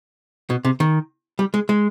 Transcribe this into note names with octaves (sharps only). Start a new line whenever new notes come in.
B2
C3
D#3
G3
G#3
G#3